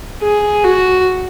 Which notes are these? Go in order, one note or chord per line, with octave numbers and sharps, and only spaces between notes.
G#4
F#4